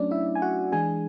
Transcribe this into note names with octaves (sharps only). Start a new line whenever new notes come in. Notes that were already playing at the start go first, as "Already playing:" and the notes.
Already playing: F#3 A3 C#4 D4 D5
E4 E5
G#5
F#4 F#5
E3 G#3 D4 G#4 G#5